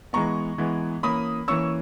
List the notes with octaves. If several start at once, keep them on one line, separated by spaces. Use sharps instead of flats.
E3 G#3 B3 A#5 C#6
E3 G#3 B3
E3 A#3 C#4 B5 D#6
E3 A#3 C#4 C#6 E6